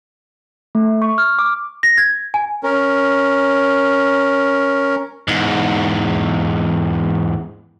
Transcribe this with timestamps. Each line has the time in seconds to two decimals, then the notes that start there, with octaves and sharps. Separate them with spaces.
0.75 A3
1.02 C#6
1.18 F6
1.39 D6
1.83 A#6
1.98 G#6
2.34 G#5
2.63 C#4 A#4
5.28 E2 G#2